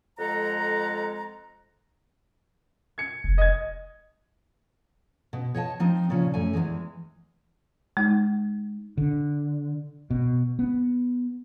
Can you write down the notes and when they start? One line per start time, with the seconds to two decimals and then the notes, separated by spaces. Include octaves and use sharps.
0.18 F2 G#3 A4 F#5 A#5
2.98 G#6 C#7
3.24 F1
3.38 D#5 G#6
5.33 B2
5.55 C#5 D#5 F#5 A5
5.79 F3 C4 D#4
6.09 A#2 C#3 F3 C#4
6.34 F#2 A3 G#5
6.53 E2 B2 E3 G#3
7.97 G#3 D#4
8.98 D3
10.10 B2
10.59 B3